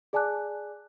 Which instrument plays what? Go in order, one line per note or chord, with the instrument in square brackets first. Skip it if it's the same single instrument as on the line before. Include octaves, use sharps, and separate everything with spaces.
[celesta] G#4 D5 G#5 A5 D6 F#6